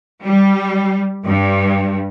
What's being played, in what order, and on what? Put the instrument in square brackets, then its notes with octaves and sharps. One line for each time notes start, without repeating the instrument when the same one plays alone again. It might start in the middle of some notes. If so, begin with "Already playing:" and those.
[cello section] G3
G2